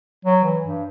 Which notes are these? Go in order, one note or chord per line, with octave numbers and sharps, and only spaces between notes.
F#3
E3
G2